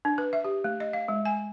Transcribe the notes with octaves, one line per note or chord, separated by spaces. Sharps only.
D4
B4
E5
G4
A3
D#5
F5
G#3
G#5